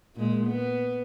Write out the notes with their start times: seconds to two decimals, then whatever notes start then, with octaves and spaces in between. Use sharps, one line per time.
0.15 A#2 G#3
0.47 B3